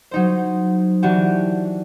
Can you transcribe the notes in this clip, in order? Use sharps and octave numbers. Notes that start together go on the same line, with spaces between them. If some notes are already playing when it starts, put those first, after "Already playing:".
F#3 D#4 C5
E3 D4 F#4 G4